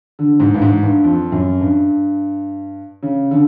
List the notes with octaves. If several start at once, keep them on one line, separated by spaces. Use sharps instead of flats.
D3
G#2
G2
G#2
G2
F2
F#2
G2
C#3
D3